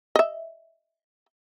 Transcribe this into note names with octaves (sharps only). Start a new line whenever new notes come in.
D#5 E5